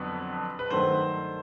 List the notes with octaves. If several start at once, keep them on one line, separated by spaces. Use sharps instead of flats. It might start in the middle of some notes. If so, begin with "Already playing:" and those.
Already playing: F2 D3 F#3 B3 B4
B4
G2 D#3 F#3 A3 C5